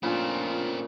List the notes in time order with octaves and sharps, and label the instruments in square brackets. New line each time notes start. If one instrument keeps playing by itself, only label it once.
[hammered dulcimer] A#2 C#3 [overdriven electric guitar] A3 C4 [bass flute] D4 [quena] F4